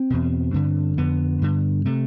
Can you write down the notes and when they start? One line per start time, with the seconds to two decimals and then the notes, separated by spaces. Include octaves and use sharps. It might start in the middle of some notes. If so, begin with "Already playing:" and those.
Already playing: C4
0.10 E2 B2
0.54 G2 D3
0.97 F2 D3 B3
1.42 G2 D3
1.85 C3 A3